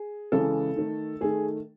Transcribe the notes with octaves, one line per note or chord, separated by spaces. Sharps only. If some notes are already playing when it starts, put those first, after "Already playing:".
Already playing: G#4
C#3 E3 G#3 A4
D#3 A3
D#3 A3 G#4